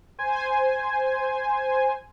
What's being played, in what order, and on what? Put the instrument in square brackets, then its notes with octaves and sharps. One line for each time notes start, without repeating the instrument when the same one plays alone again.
[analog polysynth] C5 G#5